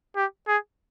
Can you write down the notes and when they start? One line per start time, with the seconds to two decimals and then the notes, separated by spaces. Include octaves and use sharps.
0.16 G4
0.48 G#4